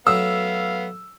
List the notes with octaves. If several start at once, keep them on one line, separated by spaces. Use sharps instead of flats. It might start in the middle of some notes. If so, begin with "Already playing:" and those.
F#3 A3 B3 F5 E6